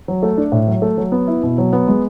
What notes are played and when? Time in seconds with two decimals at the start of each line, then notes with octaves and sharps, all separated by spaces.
0.08 F#3
0.23 A3
0.37 D4
0.52 A2
0.67 F#3
0.82 A3
0.97 F#3
1.12 B3
1.28 E4
1.43 B2
1.58 F#3
1.73 B3
1.88 G#3